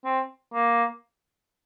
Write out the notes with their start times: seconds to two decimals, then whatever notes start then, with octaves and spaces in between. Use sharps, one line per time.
0.05 C4
0.54 A#3